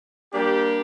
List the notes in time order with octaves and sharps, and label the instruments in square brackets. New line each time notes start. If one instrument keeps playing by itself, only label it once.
[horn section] G3 A#3 D4 G4